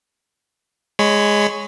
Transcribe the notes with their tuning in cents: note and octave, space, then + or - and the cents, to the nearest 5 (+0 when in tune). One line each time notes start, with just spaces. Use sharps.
G#3 +0 C#5 +0 B5 +30